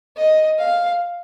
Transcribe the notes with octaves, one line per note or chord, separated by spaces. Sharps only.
D#5
F5